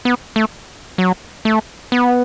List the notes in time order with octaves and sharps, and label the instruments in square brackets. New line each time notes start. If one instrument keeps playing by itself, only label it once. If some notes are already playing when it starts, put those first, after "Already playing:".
[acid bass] B3
A3
F#3
A3
B3